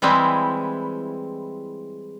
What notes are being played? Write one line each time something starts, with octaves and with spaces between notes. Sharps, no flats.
E3 G3 G#3 C4 E4